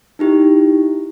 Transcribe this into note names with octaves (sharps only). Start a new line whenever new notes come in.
D#4 E4 G4